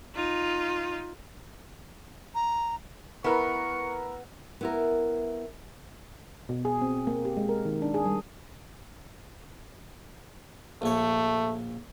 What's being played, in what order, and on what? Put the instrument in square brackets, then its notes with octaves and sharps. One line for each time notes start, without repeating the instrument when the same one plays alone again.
[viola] D#4 F4
[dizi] A#5
[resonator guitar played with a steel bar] B3 [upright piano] E4 A#4 B4 [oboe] C#6
[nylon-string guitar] B3 E4 A#4
[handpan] B2
G#4
C4
A#3
G4
G#3
A#4
D#3
D4
G#4
G3
[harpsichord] A#1 C#5 [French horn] A3